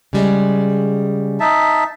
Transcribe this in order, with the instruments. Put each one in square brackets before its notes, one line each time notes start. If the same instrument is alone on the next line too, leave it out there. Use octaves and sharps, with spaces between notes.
[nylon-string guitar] C#3 G3 G#3
[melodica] D#4 E5 A5